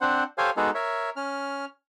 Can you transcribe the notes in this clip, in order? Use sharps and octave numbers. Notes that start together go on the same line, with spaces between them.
C4 D4 C5 F#5
G4 A4 C5 C#5 F5 G#5
G#3 B3 D#4 F#4 G#4 A4
A#4 C#5 E5
C#4 F6